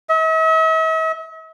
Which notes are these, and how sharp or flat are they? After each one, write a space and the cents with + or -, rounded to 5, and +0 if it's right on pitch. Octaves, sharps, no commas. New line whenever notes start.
E5 -45